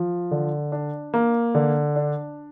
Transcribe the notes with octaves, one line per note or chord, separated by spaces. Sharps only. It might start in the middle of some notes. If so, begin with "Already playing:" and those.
Already playing: F3
D3
D4
A#3
D3
D4